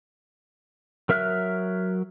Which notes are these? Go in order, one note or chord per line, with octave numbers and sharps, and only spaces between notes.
F#3 A#4 E5 F6 F#6